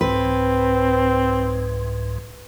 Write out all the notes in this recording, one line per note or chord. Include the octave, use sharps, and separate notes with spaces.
C2 G#2 C4 B4